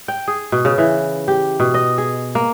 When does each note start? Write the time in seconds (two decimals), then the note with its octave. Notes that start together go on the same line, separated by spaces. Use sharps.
0.08 G5
0.28 G#4
0.52 B2
0.65 C#3
0.78 E3
1.28 G4
1.60 B2
1.74 D#5
1.98 G#4
2.35 A#3